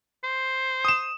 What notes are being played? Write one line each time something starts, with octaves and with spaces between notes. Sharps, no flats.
C5
D#6 E7